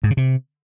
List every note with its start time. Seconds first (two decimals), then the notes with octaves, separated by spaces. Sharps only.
0.03 G#2
0.10 C#3
0.17 C3